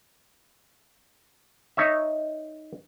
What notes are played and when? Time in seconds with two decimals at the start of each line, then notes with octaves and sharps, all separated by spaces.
1.77 D#4 C#5 E5